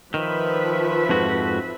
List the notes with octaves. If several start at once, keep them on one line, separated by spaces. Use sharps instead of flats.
D#3 F3 B4 E5
F2 G#2 F#4